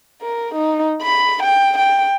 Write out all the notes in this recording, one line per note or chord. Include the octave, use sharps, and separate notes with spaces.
A#4
D#4
B5
G5
G5